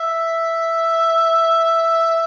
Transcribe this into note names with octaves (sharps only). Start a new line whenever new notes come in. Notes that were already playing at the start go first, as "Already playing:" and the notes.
Already playing: E5